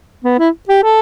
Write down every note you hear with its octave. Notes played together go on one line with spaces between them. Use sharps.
B3
E4
G4
A4